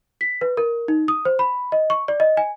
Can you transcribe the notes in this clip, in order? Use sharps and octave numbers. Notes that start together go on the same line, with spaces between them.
B6
B4
A#4
D#4
D#6
C5
B5
D#5
C#6
D5
D#5
G#5